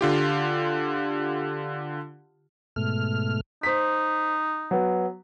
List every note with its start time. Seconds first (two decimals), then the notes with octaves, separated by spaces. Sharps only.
0.01 D3 F4 G4
2.76 G#2 B2 A3 F6
3.63 D#4 C5 B6
4.71 F#3 B3